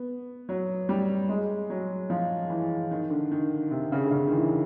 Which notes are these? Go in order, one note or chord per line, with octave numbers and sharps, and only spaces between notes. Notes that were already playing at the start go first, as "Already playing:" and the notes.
Already playing: B3
F#3
G3
G#3
F#3
F3
E3
D#3
D3
D#3
C3
C#3
D3
C#3
D#3
E3